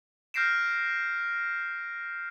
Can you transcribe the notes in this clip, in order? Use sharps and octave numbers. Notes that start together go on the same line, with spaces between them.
F6 G6 A#6 C7 D7 E7